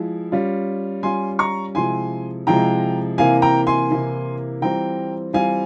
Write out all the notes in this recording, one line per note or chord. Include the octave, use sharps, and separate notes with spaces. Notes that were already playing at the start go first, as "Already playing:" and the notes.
Already playing: F3 G#3 E4
G3 C#4 F4
G3 C#4 F4 G#5 C6
A#5 C#6
C3 F3 G#3 E4 G#5 C6
C3 F3 G#3 E4 G5 A#5
C3 E3 A#3 E4 F5 G#5
G5 A#5
G#5 C6
C3 E3 A#3 E4
E3 G3 C4 F4 G5 A#5
E3 G3 C4 F4 F5 G#5